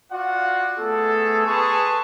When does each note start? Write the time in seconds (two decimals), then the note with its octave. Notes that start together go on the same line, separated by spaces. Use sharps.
0.11 F4 F#4 D5 F5 F#5
0.79 A3 B3 G#4 A4
1.46 G#4 B4 A5 C6 C#6